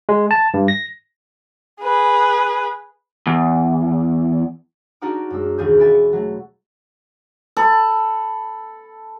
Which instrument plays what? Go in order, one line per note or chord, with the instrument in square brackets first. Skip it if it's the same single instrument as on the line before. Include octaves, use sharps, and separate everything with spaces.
[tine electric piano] G#3
A5
G2
A#6
[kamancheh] G#4 B4
[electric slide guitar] E2
[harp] D4 D#4 F#4 A#4 F#5 D6
F#2 G#3 E6
E1 D#2 G#4 G6
B4 D5 E5 G#5 A6
C#7
F#3 A3
[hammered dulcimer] A4 B5